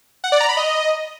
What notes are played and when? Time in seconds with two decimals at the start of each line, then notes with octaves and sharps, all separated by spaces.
0.24 F#5
0.32 D5
0.40 A#5
0.49 B5
0.57 D#5